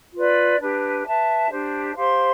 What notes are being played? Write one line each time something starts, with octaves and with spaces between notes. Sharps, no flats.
F4 B4 D5
D4 G4 B4
B4 E5 A5
D4 G4 C5
G4 C5 F5 C6